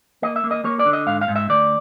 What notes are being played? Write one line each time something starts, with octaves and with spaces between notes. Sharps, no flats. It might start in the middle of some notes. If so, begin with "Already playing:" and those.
A#3 D#5
E5
A#3
D#5
A#3 C#5
D5
D3
D#5
G#2 F5
F5
G#2
E5
D2 D5